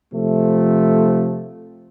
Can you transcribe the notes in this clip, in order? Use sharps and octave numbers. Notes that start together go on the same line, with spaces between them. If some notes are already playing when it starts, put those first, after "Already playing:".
C3 F3 A3